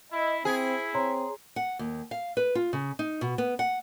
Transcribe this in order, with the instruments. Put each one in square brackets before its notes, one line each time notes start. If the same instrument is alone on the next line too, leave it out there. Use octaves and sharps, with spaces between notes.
[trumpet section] E4 [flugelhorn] D#5
[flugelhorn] C4 [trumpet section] E4 [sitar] G#4 [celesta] C5
[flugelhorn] C4 [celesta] C#5 A#5 C6
[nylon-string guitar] F#5
D#2
F5
B4
F4
C#3
D#4
B2
B3
F#5